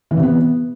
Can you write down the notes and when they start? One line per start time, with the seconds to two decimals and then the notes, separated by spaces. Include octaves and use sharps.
0.11 E3
0.17 C3
0.23 B3